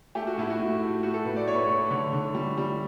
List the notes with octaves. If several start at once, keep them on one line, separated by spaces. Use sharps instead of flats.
A3 G4
F#4
A2 E4
F#4
A2
A3
A3 F#4
A4
A2 B4
D5
A2 C#5
B4
C#5
A2
D3
D3
G3
G3